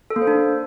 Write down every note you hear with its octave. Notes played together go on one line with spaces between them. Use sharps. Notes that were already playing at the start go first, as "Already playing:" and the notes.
A4
A#3
C5
D4